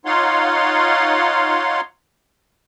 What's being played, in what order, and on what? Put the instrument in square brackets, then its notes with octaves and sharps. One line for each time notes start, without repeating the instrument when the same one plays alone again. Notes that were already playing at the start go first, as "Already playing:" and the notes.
[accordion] D#4 F4 C#5 F5 F#5 C6